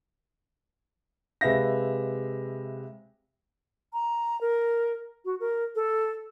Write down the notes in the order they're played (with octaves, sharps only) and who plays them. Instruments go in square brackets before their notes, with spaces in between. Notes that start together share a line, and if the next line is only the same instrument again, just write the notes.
[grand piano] C3 G#3 B4 E5 F5 A#6
[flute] A#5
A#4
F#4
A#4
A4